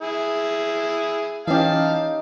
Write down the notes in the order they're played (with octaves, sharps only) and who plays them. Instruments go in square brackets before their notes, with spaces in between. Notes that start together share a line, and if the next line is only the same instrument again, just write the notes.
[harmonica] E4 G#4
[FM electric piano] E3 C#4 [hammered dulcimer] D#4 G4 [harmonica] F5 A5